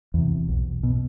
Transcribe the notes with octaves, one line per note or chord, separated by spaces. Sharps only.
E2 C3
B1
B2